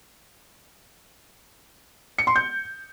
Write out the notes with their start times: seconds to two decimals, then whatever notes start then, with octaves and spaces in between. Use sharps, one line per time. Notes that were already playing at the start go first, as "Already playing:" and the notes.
2.18 C#7
2.27 C6
2.36 G6